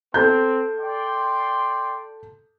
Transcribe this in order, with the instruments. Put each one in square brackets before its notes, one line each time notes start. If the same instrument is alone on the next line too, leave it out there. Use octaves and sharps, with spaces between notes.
[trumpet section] C4 [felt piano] A4 G6
[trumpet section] D5 G5 C6